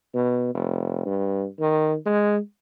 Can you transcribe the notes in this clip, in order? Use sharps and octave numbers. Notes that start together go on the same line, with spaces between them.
B2
F1
G2
D#3
G#3